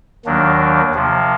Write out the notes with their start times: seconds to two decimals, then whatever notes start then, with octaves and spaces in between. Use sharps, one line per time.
0.25 D#2 D#3 F#3 A#3 D4
0.94 C3 F3 A#3